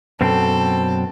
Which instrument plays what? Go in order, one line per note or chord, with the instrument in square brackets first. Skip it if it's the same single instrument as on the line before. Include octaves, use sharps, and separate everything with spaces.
[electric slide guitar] F#2 B2 C4 [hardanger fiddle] A4